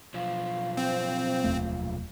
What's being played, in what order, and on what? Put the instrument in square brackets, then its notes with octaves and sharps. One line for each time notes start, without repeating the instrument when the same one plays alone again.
[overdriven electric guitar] B1 F3 [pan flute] F5
[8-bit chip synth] C4
[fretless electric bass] F1 D#2 A3